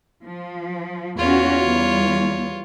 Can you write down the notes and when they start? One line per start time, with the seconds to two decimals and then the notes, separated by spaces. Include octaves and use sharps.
0.24 F3
1.18 E2 C#4 F4 F#4 C#5
1.61 E2 G3